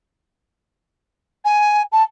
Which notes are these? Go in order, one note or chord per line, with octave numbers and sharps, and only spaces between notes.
G#5
A5